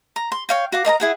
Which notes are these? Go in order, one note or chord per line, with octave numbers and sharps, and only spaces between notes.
A#5
C6
C#5 F5 G5
F#4 F5 D6
A#4 D#5 A5 A#5
E4 G#4 F#5